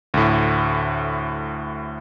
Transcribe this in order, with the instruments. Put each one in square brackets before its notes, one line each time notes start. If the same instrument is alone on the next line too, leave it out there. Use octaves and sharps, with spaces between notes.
[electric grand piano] D2 A2